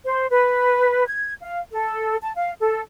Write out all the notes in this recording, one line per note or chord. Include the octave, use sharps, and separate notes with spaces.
C5
B4
G#6
F5
A4
A5
F5
A4